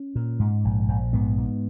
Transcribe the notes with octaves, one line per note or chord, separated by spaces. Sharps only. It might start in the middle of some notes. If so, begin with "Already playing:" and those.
Already playing: C#4
A#2
G#2
A#1
A#1
G#2 B3
G#2